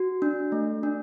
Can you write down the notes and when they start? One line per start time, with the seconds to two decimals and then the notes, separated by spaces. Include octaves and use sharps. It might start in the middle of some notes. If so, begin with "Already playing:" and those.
Already playing: F#4
0.22 D4
0.52 A3
0.83 D4